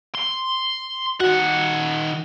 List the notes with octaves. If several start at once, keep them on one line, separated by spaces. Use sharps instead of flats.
C6
D#3 F#4 F#5